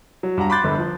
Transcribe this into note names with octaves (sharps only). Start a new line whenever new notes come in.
F#3
G2 F#5 A#5
B5 C6 D6 F#6 G6 A6
G1 D3
F3